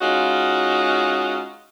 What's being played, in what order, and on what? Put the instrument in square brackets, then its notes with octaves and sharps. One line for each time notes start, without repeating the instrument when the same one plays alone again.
[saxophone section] G#3 C#4 D#4 F4 F#4